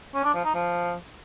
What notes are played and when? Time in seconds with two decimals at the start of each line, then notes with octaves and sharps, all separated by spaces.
0.14 C#4
0.24 D4
0.34 F3
0.44 D#4
0.54 F3